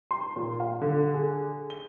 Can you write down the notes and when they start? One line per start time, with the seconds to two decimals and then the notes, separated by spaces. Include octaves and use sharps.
0.11 C6
0.36 A#2
0.60 F5
0.81 D3
1.14 G#4
1.70 G7